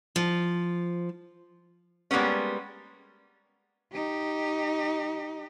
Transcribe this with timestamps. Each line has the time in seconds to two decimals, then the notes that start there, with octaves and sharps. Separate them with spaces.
0.16 F3
2.11 G3 G#3 A#3 B3 C#4
3.93 D#4 G4